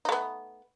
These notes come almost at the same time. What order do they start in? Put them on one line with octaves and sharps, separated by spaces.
D#4 A3 B3